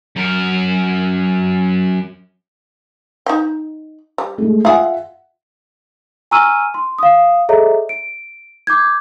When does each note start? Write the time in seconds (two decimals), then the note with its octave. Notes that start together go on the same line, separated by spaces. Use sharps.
0.16 F#2 A#4
3.26 D#4 G5
4.18 G3
4.38 G#3 A3
4.65 F4 G#4 E5 F#5
6.31 G#5 A#5 C#6 E6 F6 D#7
6.74 C6
6.99 F5 D#6
7.49 G#4 A4 C#5 D#5 E5 A#5
7.89 D7
8.67 D6 G6 G#6